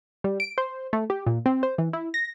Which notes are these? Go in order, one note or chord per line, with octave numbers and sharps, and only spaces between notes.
G3
D7
C5
A3
G4
A#2
C4
C5
E3
E4
A#6